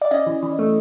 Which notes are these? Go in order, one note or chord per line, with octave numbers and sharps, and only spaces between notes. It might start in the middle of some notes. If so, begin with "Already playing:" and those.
D5
C#4 D#5
E3
E3
A3